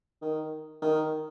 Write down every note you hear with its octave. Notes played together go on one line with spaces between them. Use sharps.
D#3
D#3